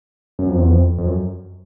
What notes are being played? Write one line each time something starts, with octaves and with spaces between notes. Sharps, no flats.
F#2
F2
E2
F2
F2
F#2